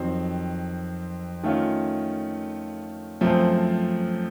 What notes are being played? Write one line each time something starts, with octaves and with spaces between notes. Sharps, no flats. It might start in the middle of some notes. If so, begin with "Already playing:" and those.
Already playing: F2 D#3 F#3 C4
D#3 A3 C#4 F4
F#2 F3 A3 C4